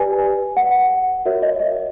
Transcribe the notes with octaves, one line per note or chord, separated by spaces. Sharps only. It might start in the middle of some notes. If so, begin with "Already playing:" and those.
Already playing: G4 B4 D5 G#5
F#5
F#4 A#4 C#5 E5
D#5
D#5